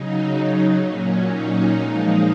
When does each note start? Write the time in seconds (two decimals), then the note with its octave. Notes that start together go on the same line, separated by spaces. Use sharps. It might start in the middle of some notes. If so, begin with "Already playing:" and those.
Already playing: C#3 F#3 D#4
0.27 D#4
0.76 A#2 F#3 C#4
1.24 D#4
1.72 A#2 F3 G#3